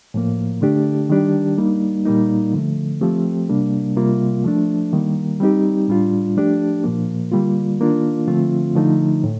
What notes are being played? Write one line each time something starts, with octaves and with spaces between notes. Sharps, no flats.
A2 F3 A#3
D3 A3 D4 G4
D#3 G3 D4 G4
G3 A#3 D#4
A#2 G3 A#3 D#4
D3 F3 A3
F3 A3 C4 G4
C3 G3 A#3 D4
C3 G3 A#3 F4
F3 A3 D4
D#3 G3 A#3
G3 C4 D#4 G4
A2 G3 D4 F4
F3 A3 D4 G4
A#2 F3 A#3
D3 G3 A#3 F4
D#3 A#3 D4 F4
D3 F3 A3 C4 F4
D3 F3 A3 D#4
A2